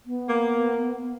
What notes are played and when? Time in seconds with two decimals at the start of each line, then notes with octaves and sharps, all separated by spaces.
0.05 B3
0.29 A#3